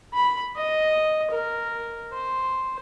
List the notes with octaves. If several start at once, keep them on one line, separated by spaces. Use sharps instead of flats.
B5
D#5
A#4
C5